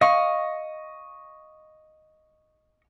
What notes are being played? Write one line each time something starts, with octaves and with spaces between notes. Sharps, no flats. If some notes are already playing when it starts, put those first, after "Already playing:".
D#5 F5 C#6